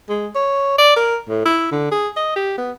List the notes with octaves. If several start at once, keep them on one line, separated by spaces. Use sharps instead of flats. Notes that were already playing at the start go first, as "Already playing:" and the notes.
G#3
C#5
D5
A#4
A2
E4
D3
G#4
D#5
G4
B3